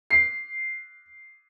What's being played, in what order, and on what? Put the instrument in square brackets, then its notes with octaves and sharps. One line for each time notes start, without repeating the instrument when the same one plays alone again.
[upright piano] C7